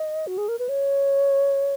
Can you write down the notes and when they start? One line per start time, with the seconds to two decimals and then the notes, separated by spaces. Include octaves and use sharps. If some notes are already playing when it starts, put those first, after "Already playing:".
Already playing: D#5
0.27 F#4
0.38 G#4
0.48 A#4
0.59 B4
0.69 C#5